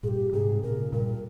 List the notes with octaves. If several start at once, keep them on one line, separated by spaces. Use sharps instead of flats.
G2 A#2 G4 G#4
G#2 C3 G#4
A#2 C#3 A#4
G2 A#2 A#4